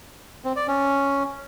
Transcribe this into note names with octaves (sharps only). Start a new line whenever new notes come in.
C4
D5
C#4